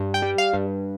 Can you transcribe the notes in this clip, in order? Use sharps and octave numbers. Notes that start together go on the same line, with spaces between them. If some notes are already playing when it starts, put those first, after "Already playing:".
Already playing: G2
G5
G3
F5
G2